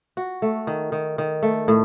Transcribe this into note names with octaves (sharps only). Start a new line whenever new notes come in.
F#4
A3
D#3
D#3
D#3
A3
A2